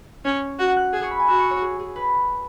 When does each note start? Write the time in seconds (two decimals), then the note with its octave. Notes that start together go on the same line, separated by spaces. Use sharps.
0.25 C#4 C#5
0.59 F#4 F#5
0.77 F#6
0.93 G#4 E6
1.03 C#6
1.11 B5
1.19 G#5
1.27 F#4 E6
1.39 C#6
1.51 C#5
1.62 G#4
1.79 G#4
1.96 B4